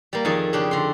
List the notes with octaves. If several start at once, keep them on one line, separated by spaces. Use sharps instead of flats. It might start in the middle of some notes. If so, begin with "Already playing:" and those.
G3 A#3
F2 D#3 C#4 G#4 A5
C#3 D4 G4
D3 C6